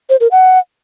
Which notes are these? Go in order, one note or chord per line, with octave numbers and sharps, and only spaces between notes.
C5
A#4
F#5